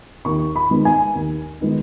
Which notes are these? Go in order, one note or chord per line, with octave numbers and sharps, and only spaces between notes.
D#2 C#6
B5
D#3 G#3 B3 D#4
G#5
D#2
D#3 G#3 B3 D#4